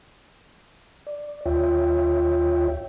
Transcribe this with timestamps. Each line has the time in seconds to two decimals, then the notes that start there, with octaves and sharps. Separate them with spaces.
1.07 D5
1.45 D#2 F4 C#5 E5 G5